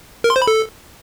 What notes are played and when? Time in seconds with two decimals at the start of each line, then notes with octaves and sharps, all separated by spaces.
0.24 A#4
0.30 C6
0.36 C5
0.42 B5
0.47 A4